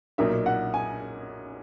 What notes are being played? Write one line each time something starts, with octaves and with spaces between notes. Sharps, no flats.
B1 A#2 A#3 D#4 E5
F#5
G#5